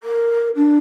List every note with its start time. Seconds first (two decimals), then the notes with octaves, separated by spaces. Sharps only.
0.03 A#4
0.55 D4